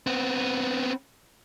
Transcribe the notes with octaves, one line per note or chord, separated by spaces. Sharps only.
B3 C4